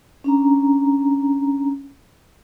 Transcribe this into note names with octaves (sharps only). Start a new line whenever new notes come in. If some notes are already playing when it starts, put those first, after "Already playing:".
C#4 D4 A#5